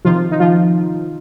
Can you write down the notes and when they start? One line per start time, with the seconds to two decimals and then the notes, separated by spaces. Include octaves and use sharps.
0.05 C3 D#3 F3 F4
0.31 D#4
0.40 F3 F4